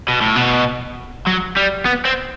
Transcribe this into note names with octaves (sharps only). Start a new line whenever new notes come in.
B2
A2
B2
F#3
G3
B3
C4